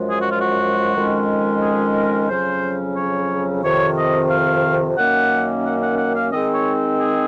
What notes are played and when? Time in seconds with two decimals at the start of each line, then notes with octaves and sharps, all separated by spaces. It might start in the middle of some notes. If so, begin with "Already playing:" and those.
Already playing: F#2 F3 G#3
0.10 G#4
0.20 F#4
0.30 F4
0.40 F#4
0.95 F2 D#3 G#3 C#4
1.62 G#4
1.95 A#4
2.29 F2 C#3 F#3 C#4 C5
2.97 C#5
3.63 F2 C3 D#3 C#5
3.97 D#5
4.30 F5
4.97 F#2 D#3 A#3 C#4 F#5
5.65 F#5
5.81 F#5
5.98 F#5
6.15 F5
6.32 D#3 G#3 C4 D#4 D#5
6.54 C#5
6.99 G#4